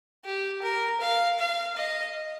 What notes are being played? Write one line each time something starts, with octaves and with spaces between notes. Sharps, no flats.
G4
A#4
F5
F5
D#5